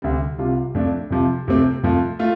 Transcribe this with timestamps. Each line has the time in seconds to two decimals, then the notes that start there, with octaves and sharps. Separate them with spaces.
0.02 D2 C3 G3
0.38 C2 C3 G3 F4
0.75 F2 F3 A3 D4
1.10 F2 C3 F3
1.48 F2 C3 A3 C4
1.83 F2 F3 A3
2.19 A3 F4